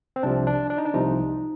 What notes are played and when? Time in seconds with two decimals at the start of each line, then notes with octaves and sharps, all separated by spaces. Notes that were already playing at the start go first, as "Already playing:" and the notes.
0.16 C4
0.23 C2 C3 F3 D4
0.47 D4
0.70 D4
0.78 D#4
0.85 D4
0.94 C2 C3 F3 D#4